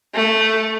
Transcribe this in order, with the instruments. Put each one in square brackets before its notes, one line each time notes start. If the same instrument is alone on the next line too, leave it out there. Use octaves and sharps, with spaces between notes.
[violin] A3